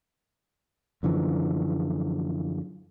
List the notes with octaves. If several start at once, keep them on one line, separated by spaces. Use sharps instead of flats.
F#2 D3 E3 F3